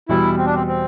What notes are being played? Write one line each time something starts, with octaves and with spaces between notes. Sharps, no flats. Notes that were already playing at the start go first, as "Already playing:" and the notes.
E2 B2 G3 E4
C4
D4
C4
C4